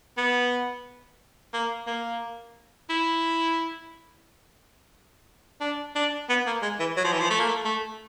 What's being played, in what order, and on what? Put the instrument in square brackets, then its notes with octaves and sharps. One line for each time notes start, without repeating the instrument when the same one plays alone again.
[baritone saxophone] B3
A#3
A#3
E4
D4
D4
B3
A#3
G#3
E3
F#3
F3
E3
F3
A3
A#3
A3
A3